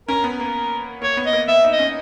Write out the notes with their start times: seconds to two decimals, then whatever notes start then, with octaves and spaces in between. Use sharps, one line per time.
0.08 C#4 A#4
0.24 B3
0.31 A#4
0.40 A#3
1.02 A#3 C#5
1.17 B3
1.26 D#5
1.33 A#3
1.48 B3 E5
1.64 D#4
1.72 D#5
1.79 C#4